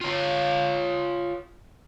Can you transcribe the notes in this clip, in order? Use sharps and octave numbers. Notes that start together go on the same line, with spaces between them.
F4 C#5